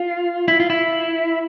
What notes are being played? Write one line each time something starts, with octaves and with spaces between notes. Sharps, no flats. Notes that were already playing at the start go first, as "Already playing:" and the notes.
Already playing: F4
E4
F4
E4